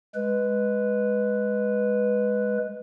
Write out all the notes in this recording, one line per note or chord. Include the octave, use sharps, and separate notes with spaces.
G#3 B4